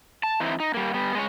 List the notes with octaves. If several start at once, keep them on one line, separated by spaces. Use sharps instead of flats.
A5
E3 C4 D#4 E4
D#4
G3 A#3
G3 B3
G#3 B4 C#5